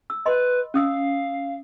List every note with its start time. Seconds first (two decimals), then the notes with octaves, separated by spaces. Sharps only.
0.10 E6
0.26 B4 D#5 B5 C6
0.74 C#4 F5 D#6 E6